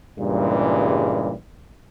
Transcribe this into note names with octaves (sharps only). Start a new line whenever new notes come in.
G2 A#2 C#3 E3 G3 G#3